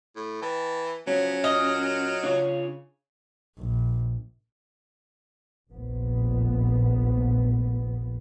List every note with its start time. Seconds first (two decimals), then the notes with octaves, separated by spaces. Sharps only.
0.16 A2
0.42 E3 G5 A5
1.07 C#3 F3 F#3 B3 C#4
1.44 A#2 D#5 F6
2.24 C#3 D4 F4 C#5
3.58 A#1
5.70 F1 A#1 A#2 B3